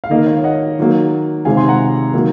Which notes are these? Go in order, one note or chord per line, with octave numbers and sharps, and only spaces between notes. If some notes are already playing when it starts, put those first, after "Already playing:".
F5
D#3 A#3 D#5
C#5 F5
D#5 F#5
D#3 F#3 A#3
C3 D#3 G#3 F5 G#5
G#5 C6
F#5 A#5
D#3 F#3 A#3